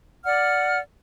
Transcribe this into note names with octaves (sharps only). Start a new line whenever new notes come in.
D5 F#5 F6